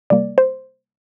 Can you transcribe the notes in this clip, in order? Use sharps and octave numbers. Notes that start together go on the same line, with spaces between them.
C3 G3 A#3 D5
C5